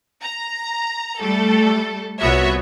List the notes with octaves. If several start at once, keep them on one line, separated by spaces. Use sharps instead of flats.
A#5
G3 A3 A4
C2 A#2 B3 F#4 C#5 E5